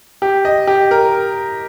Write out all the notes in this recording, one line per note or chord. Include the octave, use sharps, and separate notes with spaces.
G4
D#5
G4
A#4